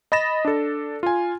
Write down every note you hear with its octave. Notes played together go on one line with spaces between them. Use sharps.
D#5 B5 A6 A#6 E7
D4 A4
F4 G#5